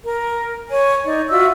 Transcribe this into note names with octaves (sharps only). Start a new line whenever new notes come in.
A#4
C#5 G#5
D#4 D5
F4 F#4 E5 E6